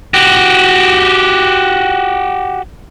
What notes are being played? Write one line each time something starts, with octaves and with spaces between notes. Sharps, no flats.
F#4 G4